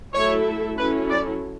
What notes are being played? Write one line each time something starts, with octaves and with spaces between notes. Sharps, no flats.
F#3 A3 E4 A4 C#5 E5
F#3 C#4 E4 A4 B4
D5